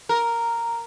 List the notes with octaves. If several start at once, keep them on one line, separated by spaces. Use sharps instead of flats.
A#4